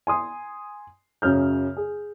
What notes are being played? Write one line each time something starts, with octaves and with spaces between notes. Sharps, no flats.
G#5 C6 D#6
F#2 C#3 F6 G6
G#4